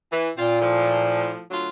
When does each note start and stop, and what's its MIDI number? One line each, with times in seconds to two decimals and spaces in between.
0.12 0.30 52
0.38 1.33 46
0.38 0.57 60
0.38 0.57 65
0.60 1.43 45
0.60 1.43 53
1.51 1.69 38
1.51 1.69 54
1.51 1.69 65